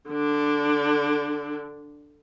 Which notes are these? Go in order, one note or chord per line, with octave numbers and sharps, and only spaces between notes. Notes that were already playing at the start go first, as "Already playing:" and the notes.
D3 D4